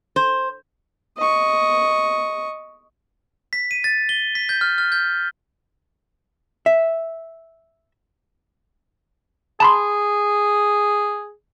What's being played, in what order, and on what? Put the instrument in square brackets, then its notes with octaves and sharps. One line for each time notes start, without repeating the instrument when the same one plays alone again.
[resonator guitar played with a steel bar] C5
[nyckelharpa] D#5 C#6
[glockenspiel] B6
D#7
A6
G7
B6
G6
F6
F6
G6
[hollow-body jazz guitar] E5
[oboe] G#4 [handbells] A5 B5 C6